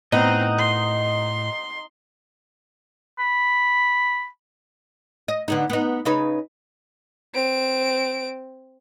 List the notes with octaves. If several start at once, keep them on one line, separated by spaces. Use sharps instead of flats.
A2 B3 C4 D#4 D#5 F#5
C6
B5
D#5
D3 B3 D#4
B3 D#4
C#3 D#4 B4
C4 D7